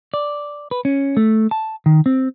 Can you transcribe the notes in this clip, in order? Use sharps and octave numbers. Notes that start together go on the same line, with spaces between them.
D5
B4
C#4
A3
A5
D#3
C4